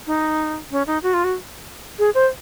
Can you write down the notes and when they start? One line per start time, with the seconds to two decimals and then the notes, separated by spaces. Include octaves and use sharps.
0.07 D#4
0.71 C#4
0.87 D#4
1.03 F#4
1.14 F4
1.24 F#4
1.99 G#4
2.15 C5